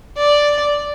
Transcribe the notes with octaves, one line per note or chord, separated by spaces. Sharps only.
D5